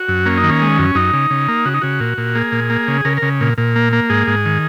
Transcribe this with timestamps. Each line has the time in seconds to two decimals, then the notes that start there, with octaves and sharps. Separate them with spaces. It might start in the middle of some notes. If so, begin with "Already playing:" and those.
Already playing: F#4
0.08 F#2
0.26 A#3 C#4
0.38 D#4
0.44 D#3
0.49 C#4
0.61 G#3
0.79 F#2
0.95 F#2 D#4
1.13 C#3
1.31 C#3
1.48 A#3
1.65 C#3 F#4
1.74 D#4
1.81 C#3 F#4
2.00 A#2
2.18 A#2
2.35 A#3 G#4
2.52 A#2
2.70 A#3
2.88 C#3
3.05 C#3 A#4
3.17 A#4
3.22 C#3
3.41 A#2
3.58 A#2
3.76 A#3
3.93 A#3
4.09 G#2 G#4
4.27 G#2
4.45 D#3